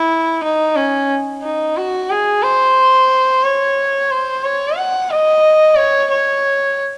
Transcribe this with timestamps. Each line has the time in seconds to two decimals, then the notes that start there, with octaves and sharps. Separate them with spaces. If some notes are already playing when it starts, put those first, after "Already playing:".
Already playing: E4
0.43 D#4
0.76 C#4
1.42 D#4
1.77 F#4
2.10 G#4
2.43 C5
3.44 C#5
4.11 C5
4.44 C#5
4.77 F#5
5.11 D#5
5.77 C#5
6.10 C#5